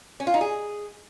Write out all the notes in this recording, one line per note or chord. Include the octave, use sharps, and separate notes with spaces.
C#4
F4
D#4
G#4